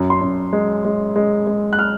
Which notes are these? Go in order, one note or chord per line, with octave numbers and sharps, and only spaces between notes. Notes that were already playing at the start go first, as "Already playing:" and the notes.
Already playing: F#2
C6
F#2
G#3
G#3
G#3
G#3
F#6
F6